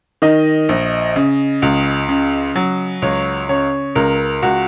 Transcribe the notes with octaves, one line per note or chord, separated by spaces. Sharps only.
D#3 D#5
A#1
C#3
C#2
C#3
F#3
C#2 C#5
C#3 C#5
C#2 A#4
C#2 F#4